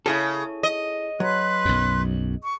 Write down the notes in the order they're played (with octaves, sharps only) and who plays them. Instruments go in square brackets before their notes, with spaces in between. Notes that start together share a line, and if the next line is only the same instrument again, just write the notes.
[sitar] C#3 [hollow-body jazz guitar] E4 G#4 A4
[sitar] D#5
[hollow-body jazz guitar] F#3 [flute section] B4 C6 F#6
[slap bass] B1 F#2
[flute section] C#6